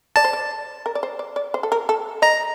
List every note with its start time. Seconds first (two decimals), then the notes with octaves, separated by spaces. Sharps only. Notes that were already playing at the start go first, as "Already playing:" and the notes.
0.16 D5 A5
0.24 C5
0.33 D5
0.86 A#4
0.95 D5
1.03 C5
1.19 D5
1.36 D5
1.54 C5
1.63 A4
1.72 A#4
1.89 A4
2.22 D#5 A#5